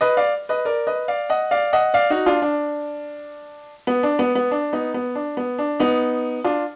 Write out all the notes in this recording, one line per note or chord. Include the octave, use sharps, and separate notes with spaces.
B4 D#5
D5 F5
B4 D#5
A#4 D5
B4 D#5
D5 F5
D#5 F#5
D5 F5
D#5 F#5
D5 F5
D#4 F#4
D4 F4
D4
B3
D4
B3
B3
D4
B3 D#4
B3
D4
B3
D4
B3 D#4
D4 F4